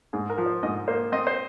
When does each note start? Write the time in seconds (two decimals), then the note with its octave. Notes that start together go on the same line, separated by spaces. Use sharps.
0.13 G#2 G#4
0.30 A#4
0.38 F3
0.46 C5
0.63 G#2 D#5
0.88 A#3 C5
1.12 C4 D#5
1.27 C5